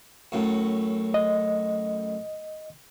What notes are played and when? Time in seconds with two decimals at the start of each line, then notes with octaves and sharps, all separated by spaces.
0.32 F#2 A2
1.14 D#5